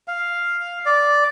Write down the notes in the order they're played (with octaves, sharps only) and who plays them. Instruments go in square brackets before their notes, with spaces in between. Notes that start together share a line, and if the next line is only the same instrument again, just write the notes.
[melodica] F5
D5